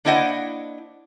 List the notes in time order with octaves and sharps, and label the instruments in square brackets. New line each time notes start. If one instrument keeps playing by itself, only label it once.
[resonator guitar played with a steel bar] A#3 D4 E4 C5 D#5 F#5